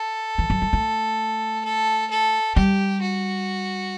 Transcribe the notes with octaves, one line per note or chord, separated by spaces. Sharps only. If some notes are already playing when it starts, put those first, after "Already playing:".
Already playing: A4
E3
F#3
G3
A3
A4
A4
G3 G4
F#4